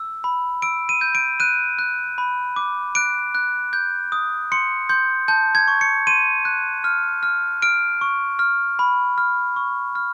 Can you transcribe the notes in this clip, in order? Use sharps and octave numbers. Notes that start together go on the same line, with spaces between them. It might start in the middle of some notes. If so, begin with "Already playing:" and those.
Already playing: E6
B5
E6 D7
D#7
G6
D7
F#6 D#7
F#6
B5
D6
F#6 D7
F#6
G6
D#6
C6 C#7
C6 G6
A5 G6
G#6
C#6
C#7
C6 D#7
F#6
F6
F6
F6 D7
C#6
F6
B5
F6
C#6
F6